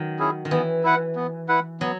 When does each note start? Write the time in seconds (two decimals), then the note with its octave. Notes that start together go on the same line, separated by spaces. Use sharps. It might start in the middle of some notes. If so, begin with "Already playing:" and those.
Already playing: D#3 F#3
0.19 C#4 E4 G#4
0.45 D#3
0.51 E3 B3
0.84 E4 B4 F#5
1.16 B3
1.48 E4 B4 F#5
1.80 F#3 B3